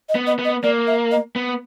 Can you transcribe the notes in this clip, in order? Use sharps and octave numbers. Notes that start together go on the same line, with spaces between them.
D#5
B3
D#5
B3
D#5
A#3 D5
E5
D#5
B3